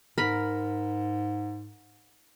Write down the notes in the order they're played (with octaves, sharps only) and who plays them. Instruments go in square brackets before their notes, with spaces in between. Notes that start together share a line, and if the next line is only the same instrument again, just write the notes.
[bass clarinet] G#2 [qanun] A#4 B5